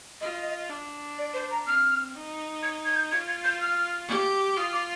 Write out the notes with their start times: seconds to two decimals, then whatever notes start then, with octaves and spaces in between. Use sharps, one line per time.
0.21 F4 D#5
0.69 D4
1.18 D5
1.34 C5
1.50 A#5
1.66 C4 F6
2.15 D#4
2.63 G#6
2.85 G#6
2.95 G6
3.11 F4 G#6
3.28 G#6
3.44 G6
3.60 F6
4.08 G4
4.57 F4 D#6
4.73 D6